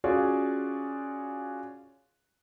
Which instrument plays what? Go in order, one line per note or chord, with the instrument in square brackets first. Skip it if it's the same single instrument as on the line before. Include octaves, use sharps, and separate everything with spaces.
[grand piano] C#4 F4 F#4 G#4 D5